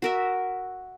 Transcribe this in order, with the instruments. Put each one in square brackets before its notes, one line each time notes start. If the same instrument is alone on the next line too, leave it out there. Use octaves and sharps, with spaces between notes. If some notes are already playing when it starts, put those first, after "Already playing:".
[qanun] F#4 A#4 E5